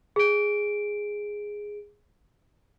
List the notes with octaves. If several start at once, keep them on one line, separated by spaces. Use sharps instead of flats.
G#4 D7